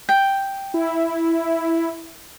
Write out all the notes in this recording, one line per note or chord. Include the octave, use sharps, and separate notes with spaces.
G5
E4